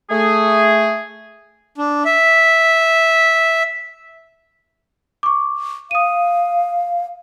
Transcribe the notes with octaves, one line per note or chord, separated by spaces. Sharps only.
A3 G#4
D4
E5
C#6 D6
F5 D#6 D#7